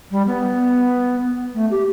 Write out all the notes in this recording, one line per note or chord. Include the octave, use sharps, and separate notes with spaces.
G3
B3
A3
G4